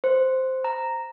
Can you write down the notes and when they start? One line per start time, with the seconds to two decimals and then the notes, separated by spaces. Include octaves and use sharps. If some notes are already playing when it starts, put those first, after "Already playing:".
0.04 C5
0.64 A#5